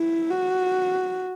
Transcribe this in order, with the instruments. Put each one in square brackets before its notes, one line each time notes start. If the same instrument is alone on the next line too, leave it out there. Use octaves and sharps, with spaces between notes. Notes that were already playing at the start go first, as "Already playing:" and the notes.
Already playing: [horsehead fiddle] E4
F#4